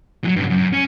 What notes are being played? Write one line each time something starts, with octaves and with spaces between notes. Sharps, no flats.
E3 F#3
G2 C#3
F#2
C#4